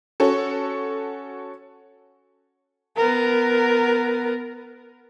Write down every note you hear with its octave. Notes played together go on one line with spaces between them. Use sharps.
C#4 F#4 A4
B3 A#4